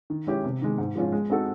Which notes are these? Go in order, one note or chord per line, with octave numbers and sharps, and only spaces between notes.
D#3
G#3 C#4 E4 G4
C3
D#3 G#3
G#2
F3 G#3 C#4 F4
G#3
C4 D#4 F#4 A4